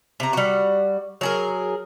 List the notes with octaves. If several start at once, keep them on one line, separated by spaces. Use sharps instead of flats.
C3 A#5
G3 F#4
F#3 G#4 A#4